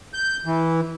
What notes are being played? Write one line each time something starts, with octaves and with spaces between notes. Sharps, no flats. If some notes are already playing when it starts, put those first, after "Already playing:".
G6
E3